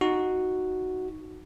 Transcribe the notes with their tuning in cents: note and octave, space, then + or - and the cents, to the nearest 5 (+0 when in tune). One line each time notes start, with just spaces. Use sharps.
D#4 +0 F#4 +0